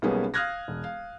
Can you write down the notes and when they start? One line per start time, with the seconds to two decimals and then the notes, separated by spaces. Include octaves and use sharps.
0.02 B1 G3 A#3 B3 C#4 G#4
0.34 F5 D#6 F6 F#6 G#6 A#6
0.68 E1
0.84 F5